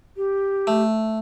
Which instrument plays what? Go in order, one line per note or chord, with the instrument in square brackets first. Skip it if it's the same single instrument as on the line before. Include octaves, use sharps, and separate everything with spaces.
[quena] G4
[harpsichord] A3